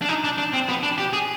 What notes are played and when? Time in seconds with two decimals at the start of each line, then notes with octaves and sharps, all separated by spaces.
0.02 D4
0.09 D#4
0.24 D4
0.38 D4
0.54 C4
0.69 B3
0.83 D4
0.98 G4
1.13 G#4